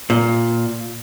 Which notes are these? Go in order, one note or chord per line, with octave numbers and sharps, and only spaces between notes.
A#2